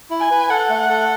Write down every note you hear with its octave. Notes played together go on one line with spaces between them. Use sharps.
E4
G#5
B4
A4 F#5
A3
F#5
A4